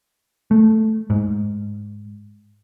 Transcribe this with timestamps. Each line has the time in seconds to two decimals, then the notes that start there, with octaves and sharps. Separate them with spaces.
0.51 A3
1.10 G#2